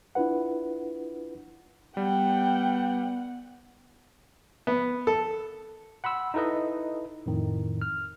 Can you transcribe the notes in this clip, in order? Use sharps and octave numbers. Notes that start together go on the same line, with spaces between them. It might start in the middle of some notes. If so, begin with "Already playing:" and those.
D4 E4 F4 B4 F#5
G3 B3 F#5 G5
B3
A4
F#5 B5 C6 E6
D#4 E4 A4 B4 D#5
F2 A2 D#3
F6